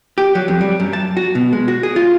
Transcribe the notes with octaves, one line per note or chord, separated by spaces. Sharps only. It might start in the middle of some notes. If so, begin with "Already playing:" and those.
G4
F#3
F2
G3
F#2
A5
F#4
B2
G#3
F#4
G#4
F4